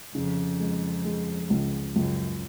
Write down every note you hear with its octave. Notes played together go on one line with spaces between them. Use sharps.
F2 C#3
G#3
G#3
C#2
C#2 F#2